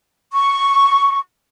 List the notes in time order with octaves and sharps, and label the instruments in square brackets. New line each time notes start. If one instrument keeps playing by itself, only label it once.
[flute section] C#6